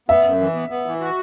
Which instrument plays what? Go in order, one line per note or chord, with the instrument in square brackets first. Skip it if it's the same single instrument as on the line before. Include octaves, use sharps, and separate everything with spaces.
[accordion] B3 [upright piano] E5
[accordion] F#2
E3
B3
B3
E3
F#4